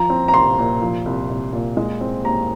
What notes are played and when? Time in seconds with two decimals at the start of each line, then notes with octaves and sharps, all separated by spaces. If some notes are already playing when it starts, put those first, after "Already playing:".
Already playing: F3 A#5
0.10 C4
0.28 A#5
0.34 C2 C6
0.58 A#2
0.81 F3
1.06 C2
1.29 C2
1.53 A#2
1.77 G#3
2.01 C4
2.24 D#2 A#5